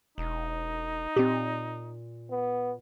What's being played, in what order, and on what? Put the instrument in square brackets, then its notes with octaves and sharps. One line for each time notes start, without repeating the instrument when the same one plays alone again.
[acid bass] E1 [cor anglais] D#4
[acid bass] A#2 [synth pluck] C4 G4
[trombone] B3